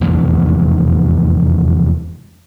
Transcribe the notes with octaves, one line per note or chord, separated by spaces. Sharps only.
F1 E2 G#2